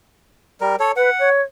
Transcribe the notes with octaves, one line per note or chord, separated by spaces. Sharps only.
G3 A#4
A4 C#5
B4 F#5
C#5